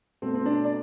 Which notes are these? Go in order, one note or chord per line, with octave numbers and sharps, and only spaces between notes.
B2 A3 C4
C4
D4
D5